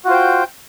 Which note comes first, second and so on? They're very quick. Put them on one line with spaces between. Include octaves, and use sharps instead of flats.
F#4 F4 C5 G5